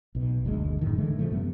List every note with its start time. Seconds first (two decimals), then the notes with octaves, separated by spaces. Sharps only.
0.15 B1 B2
0.45 F#1 D2 A#2 G#3
0.81 F#2 A2 D#3
0.98 D3 E3 G#3 A3
1.19 C#3 F3 A3
1.32 F#2 C3 G3 B3